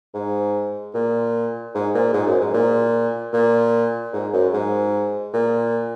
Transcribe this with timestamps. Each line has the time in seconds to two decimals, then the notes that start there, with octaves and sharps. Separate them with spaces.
0.14 G#2
0.94 A#2
1.74 G#2
1.94 A#2
2.13 G#2
2.27 F#2
2.41 G#2
2.53 A#2
3.33 A#2
4.13 G#2
4.33 F#2
4.53 G#2
5.33 A#2